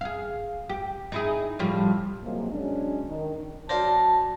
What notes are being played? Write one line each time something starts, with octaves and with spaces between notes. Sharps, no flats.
G#4 F5
G4
D#4 E4 G#4
A2 F3 G3
C3 F3 F#3 G#3 A#3
F#3 G#3 C#4 D4
D#3
F#3 C5 D5 F5 A5 A#6